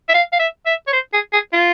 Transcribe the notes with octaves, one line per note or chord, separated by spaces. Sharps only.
E5
F5
F5
E5
E5
C#5
C5
G#4
G#4
F4